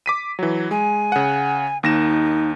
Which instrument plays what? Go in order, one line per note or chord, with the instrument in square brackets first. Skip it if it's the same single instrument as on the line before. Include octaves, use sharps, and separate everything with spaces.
[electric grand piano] D6 B6 D#7
E3 F#3
[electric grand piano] G#3 [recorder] G#5
[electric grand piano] C#3 F#5
[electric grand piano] D#2 A#6 E7 [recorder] D#4